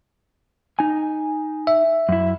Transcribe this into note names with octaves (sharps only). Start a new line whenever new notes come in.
D#4 G#5
E5
F#2 E4